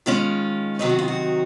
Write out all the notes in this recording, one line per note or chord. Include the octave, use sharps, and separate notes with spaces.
D#3 G#3 C#4 F4
C3 D#3 F#3 C4 D#4 G#4
F#4
F4
F#4